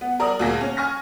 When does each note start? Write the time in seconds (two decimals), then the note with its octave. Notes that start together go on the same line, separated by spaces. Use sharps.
0.01 B3
0.20 A#4 D5 A#5 D#6
0.39 D2 A#2 A#3 G#4 A#6
0.61 C#4
0.77 G#5 C#6 F6 A#6